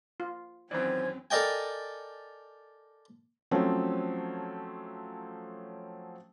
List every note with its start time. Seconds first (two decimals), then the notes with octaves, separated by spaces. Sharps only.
0.20 F4
0.71 F#2 D#3 E3 C4 C#4 C5 D5 G#6
1.31 A4 A#4 D5 D#5 G5 G#5
3.51 F3 F#3 A3 C4 C#4